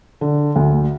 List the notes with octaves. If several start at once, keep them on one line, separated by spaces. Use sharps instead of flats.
D3
D2